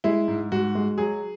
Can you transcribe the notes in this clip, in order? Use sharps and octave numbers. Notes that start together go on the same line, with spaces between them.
G#3 E4
G#2
G#2 F#4
G#3
F#3 G#4